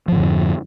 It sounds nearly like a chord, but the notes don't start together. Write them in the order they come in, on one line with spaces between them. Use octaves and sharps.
F3 G#2 D3 F2